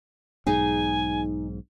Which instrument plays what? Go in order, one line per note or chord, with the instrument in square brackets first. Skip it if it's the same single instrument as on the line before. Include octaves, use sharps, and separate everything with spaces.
[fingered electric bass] B1 G#2 [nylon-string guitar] D#4 G#4 [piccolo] G#5